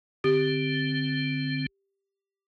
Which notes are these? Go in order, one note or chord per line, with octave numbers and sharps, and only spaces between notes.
D3 C4 G4